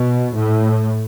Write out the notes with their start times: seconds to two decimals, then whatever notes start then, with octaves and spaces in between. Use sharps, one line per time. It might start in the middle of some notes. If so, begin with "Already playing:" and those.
Already playing: B2
0.37 A2